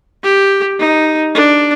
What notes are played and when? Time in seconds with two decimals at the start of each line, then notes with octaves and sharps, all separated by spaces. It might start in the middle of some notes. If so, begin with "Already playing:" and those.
0.23 G4
0.79 D#4
1.35 D4